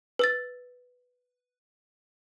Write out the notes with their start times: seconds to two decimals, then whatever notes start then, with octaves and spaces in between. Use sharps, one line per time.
0.19 B4 E6 A6